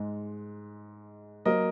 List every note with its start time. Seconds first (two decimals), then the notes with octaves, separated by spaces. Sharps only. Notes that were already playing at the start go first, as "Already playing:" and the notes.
Already playing: G#2 G#3
1.45 F#3 A#3 A#4 D#5